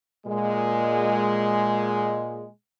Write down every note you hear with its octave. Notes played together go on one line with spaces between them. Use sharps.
A#2 G#3